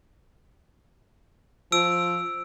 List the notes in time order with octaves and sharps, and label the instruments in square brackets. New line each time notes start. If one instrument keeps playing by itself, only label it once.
[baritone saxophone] F3 [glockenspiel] E6 D7